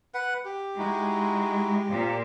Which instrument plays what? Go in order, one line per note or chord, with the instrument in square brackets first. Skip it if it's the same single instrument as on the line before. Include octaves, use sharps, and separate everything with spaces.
[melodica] B4 F#5
G4
[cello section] G#3 [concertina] D#4 E4 F#4
[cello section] A#2 [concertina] C4 F4